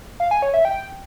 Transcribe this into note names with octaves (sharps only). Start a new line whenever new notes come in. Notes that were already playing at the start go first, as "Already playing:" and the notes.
F5
G#5
C#5
E5
G5